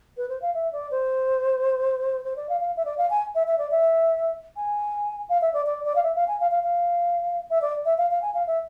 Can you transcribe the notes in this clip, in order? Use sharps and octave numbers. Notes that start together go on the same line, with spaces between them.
B4
C5
F5
E5
D5
C5
C5
D5
F5
F5
E5
D5
F5
G#5
E5
E5
D5
E5
G#5
F5
E5
D5
D5
D5
F5
E5
F5
G#5
F5
F5
F5
E5
D5
E5
F5
F5
G#5
F5
E5